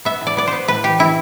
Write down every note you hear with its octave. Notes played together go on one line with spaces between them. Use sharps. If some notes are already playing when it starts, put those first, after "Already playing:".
B3 E5
A2
D5
B3 D5
B3 C5
A2 B4
E3 G4
E3 E4